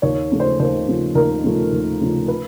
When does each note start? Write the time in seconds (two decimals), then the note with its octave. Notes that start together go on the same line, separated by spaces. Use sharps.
0.02 D#2 C#5
0.32 C#3 F3 A3
0.40 C5
0.60 D#2 C5
0.88 C#3 F3 A3
1.15 D#2 A#4
1.44 C#3 F3 A3
1.72 D#2
2.01 C#3 F3 A3
2.28 B4